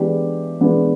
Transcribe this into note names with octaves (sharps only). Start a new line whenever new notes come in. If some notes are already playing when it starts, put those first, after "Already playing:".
Already playing: E3 G#3 B3 D4 G4
E3 G#3 B3 D4